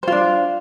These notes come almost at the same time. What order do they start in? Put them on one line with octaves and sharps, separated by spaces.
C5 F4 D4